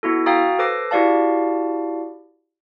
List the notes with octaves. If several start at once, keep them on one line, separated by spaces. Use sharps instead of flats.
B3 E4 F#4 A4
F#4 F5 G5 A#5 D#6 A6
A4 B4 C5 D6 A#6 C7
E4 F#4 G4 D5 F5 A5